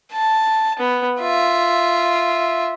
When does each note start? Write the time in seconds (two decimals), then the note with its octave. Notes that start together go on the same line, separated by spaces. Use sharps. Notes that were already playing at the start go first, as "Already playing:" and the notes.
0.12 A5
0.79 B3
1.20 F4 E5